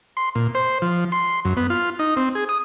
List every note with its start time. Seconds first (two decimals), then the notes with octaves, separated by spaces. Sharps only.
0.17 C6
0.35 A#2
0.55 C5
0.82 F3
1.12 C6
1.45 F#2
1.57 B3
1.70 F4
1.99 D#4
2.17 C4
2.35 G#4
2.49 D#6